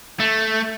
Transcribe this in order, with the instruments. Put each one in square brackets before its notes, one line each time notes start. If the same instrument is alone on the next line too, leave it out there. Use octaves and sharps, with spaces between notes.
[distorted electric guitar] A3